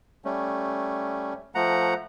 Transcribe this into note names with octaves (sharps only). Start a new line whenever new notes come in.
G3 A3 C#4
F3 A3 F#5 A#5